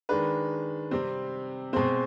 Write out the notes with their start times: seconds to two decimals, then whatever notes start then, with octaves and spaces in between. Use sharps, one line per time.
0.09 D#3 G#3 D4 B4
0.91 C3 G3 C4
1.73 B2 G#3 C4 C5